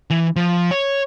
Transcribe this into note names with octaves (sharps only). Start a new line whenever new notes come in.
E3
F3
C#5